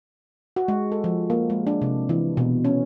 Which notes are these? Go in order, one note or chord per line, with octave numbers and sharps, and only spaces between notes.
F#4
G#3
A4
F3
A#3
G#3
D4
C3
E3
B2
C#4